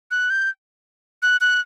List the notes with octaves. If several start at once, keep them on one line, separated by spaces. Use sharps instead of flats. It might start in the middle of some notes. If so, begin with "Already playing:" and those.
F#6
G6
F#6
F#6